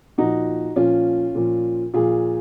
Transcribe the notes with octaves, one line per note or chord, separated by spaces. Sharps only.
A#2 F3 D#4 F#4
A#2 F3 C#4 F4
A#2 F3
A#2 F3 F4 G#4